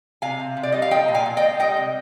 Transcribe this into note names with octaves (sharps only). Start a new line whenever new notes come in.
C3 F5 G#5
C3
C3
D5
G3 D#5
F5
F3 D#5 G5
A#2
F5 G#5
A#2
D#5 G5
G#3
G3 D#5 G5
C3